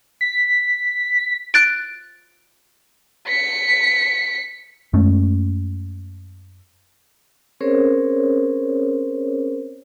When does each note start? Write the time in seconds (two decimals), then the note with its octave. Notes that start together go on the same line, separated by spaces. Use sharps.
0.21 B6
1.54 F#6 A6 D7
3.28 B6 C#7
4.93 F#2 G#3 A3 C#4
7.60 C4 C#4 G#4 A#4 C5 C#5